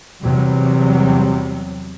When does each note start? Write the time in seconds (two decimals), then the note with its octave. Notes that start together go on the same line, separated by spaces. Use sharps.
0.24 E2 C3 F#3 G3